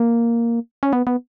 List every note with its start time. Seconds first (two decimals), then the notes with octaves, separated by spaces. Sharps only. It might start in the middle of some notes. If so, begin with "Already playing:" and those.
Already playing: A#3
0.83 C#4
0.93 B3
1.07 B3